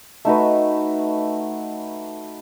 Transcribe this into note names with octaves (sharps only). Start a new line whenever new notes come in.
A3 D#4 F#4 B4